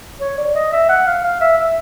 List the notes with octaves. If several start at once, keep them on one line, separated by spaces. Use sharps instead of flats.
C#5
D5
D#5
E5
F#5
F5
F5
E5
E5